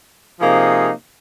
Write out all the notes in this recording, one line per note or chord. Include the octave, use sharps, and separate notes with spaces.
C3 F3 A#3 D#4 G#4